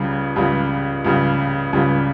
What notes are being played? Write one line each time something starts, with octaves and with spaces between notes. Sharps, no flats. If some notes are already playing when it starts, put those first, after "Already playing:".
Already playing: C#2 C#3 G3
C#2 C#3 G3
C#2 C#3 G3
C#2 C#3 G3